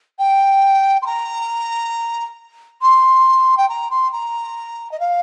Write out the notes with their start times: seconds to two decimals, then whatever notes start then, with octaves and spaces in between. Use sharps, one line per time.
0.19 G5
1.02 C6
1.06 A#5
2.81 C6
3.57 G5
3.69 A#5
3.91 C6
4.12 A#5
4.92 D#5
5.00 F5